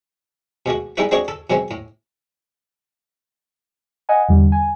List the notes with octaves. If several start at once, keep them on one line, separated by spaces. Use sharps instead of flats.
B2 G#3 A3 F#4
G3 G#3 B3 D#4 E4 B4
G#3 C4 D4 F#4 C#5 D#5
A4
B2 F#3 G#3 C4 C#4
A2
D#5 F#5 G#5
E2 D3 G3
G#5